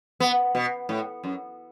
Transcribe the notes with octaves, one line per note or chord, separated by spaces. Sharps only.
B3
B2
A2
F#2